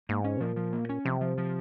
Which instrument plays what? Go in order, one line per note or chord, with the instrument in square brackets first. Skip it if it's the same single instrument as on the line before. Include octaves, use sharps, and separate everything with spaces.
[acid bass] G#2 [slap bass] A#3
[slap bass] C#4
[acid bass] C3
[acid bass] A#2 [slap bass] F3
[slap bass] F3
A#3
C#4
[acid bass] C3 [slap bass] F3
[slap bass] F3
F3